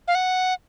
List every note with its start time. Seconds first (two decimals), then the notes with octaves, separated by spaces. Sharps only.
0.08 F5
0.15 F#5